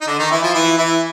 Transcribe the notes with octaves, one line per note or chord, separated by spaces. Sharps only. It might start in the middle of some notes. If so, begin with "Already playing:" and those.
D#4
D3 D4
D#3 D#4
E3 E4
F3 F4
E3 E4
E3 E4